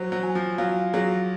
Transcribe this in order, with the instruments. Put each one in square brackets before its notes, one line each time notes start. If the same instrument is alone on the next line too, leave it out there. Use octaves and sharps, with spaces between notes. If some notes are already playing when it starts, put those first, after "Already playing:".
Already playing: [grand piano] F#3 [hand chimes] C5
[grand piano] F#3
[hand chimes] G#5
[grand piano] F3
[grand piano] F#3 [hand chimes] F5
[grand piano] F#3 [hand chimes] G#4